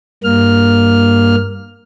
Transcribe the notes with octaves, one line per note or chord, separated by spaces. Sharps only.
G2 A#3 F6